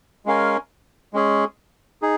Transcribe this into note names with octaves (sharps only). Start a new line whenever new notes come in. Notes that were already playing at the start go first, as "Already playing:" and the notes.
G#3 C#4 A#4 F5 G#5
G#3 C#4 G#4
D#4 G#4